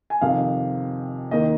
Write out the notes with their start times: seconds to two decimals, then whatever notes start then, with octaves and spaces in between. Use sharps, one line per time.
0.10 G#5
0.21 F2 C3 D#3 F5
1.31 D#2 D#3 A#3 D#5